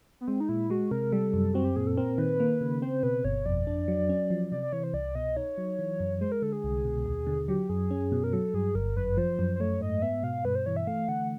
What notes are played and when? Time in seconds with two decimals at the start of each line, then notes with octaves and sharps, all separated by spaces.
0.21 B3
0.27 G#3 C4
0.40 D#4
0.49 A#2 E4
0.70 G#3 F#4
0.91 C3 A#4
1.12 G3 A4
1.33 F#2
1.54 C4 F#4
1.65 G4
1.76 A#2 G#4
1.87 A4
1.97 C4 A#4
2.18 D#3 B4
2.40 A#3
2.61 C#3
2.82 C4 C5
3.03 B2 B4
3.25 G1 C#5
3.46 F2 D5
3.67 D4
3.88 F#3
4.09 C#4
4.30 F3
4.52 C3 D5
4.62 D5
4.72 E3 C#5
4.83 C5
4.94 C2 D5
5.15 B2 D#5
5.36 D#4 C#5
5.58 F#3
5.79 E3
6.00 F#2
6.21 G#3 C5
6.32 A#4
6.42 D3 A4
6.53 G#4
6.64 C2
6.85 B2
7.06 D#2
7.27 D3
7.48 F#3 G4
7.69 F#2 G#4
7.91 C#4
8.12 B2
8.24 A#4
8.33 F#3 A4
8.54 G2 G#4
8.75 G1 A#4
8.97 F#2 B4
9.17 F3 C5
9.39 F#2
9.56 C5
9.60 A3 C#5
9.81 G#2 D#5
10.02 B3 E5
10.23 B2 F5
10.45 G2 B4
10.55 C5
10.66 E3 C#5
10.76 E5
10.87 A3 F5
11.08 D3 F#5